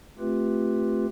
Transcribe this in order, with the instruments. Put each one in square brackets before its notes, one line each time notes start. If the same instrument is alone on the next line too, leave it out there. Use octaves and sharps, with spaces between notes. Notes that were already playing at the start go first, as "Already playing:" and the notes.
[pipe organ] A3 C4 F4 G4 B4